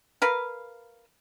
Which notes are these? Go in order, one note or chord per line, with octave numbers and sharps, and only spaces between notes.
A#4 B4 F5